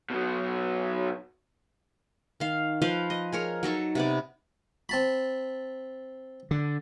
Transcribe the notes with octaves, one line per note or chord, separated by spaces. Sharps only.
B2 F#3
D#3 F5
F3 B4 C5 F5
D#5
G#4 A#4 C#5
F#3 D#4 A4 C#6
C3 B3 D5
C4 A5 B5
D3